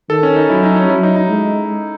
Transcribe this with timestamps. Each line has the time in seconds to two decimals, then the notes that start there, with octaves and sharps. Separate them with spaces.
0.09 D#3 A4
0.23 C#4
0.36 D#4
0.50 F#3 E4
0.63 D#4
0.76 C#4
0.89 F#3 E4
1.03 D#4
1.16 D#4
1.29 G#3